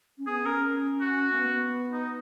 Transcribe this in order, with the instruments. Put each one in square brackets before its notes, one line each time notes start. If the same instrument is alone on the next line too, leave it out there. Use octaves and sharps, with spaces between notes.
[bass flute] C#4
[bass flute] B3 [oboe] G#4
[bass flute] C#4 [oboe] A#4
[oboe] F#4
[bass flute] A#3
B3
[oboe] D#4